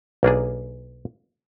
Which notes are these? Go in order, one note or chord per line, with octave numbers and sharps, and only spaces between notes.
B1 A#3 D4 G#4